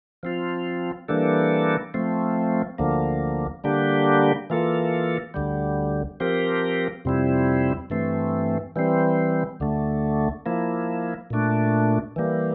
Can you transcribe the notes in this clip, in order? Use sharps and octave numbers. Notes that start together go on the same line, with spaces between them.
F3 C4 F4
E3 G3 A#3 D4 A4
F3 A3 C4
D2 D3 F3 A#3
D3 G3 A#3 D4 G4
E3 A#3 F4 A4
D2 D3 G3
F3 C4 G4 A#4
F2 C3 G3 C4 E4
G2 E3 A3 C4
E3 G3 C4
D2 D3 A3
F3 A#3 E4
A#2 A3 D4
E3 G3 A#3